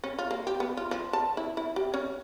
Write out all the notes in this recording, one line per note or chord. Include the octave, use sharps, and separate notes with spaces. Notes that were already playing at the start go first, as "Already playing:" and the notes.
C#4
F4
A#3
G4
B3
F4
F3
A5
E4
E4
G4
C#4